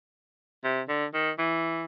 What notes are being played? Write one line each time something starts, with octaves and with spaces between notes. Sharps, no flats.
C3
D3
D#3
E3